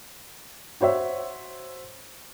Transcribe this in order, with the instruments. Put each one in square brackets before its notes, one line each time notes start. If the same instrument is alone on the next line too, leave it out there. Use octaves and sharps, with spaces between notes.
[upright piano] F#4 C5 C#5 E5